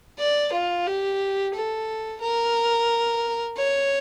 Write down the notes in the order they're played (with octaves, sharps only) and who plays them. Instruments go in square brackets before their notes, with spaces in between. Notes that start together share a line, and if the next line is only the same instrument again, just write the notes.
[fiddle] D5
F4
G4
A4
A#4
C#5